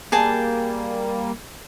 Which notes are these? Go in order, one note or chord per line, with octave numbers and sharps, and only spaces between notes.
G3 A#3 G#4 G5 A5